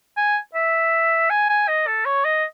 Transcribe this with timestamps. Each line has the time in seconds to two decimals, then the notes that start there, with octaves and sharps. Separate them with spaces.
0.17 G#5
0.55 E5
1.30 G#5
1.50 G#5
1.68 D#5
1.87 A4
2.06 C#5
2.25 D#5